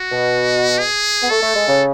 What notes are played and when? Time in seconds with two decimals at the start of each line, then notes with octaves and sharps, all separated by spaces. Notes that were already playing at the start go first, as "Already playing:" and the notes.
Already playing: F#4
0.11 B2
0.78 G#4
1.22 B3
1.30 A3 A4
1.42 A3
1.55 G#3
1.68 C#3